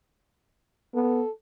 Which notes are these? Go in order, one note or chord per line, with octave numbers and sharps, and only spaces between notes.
B3 A4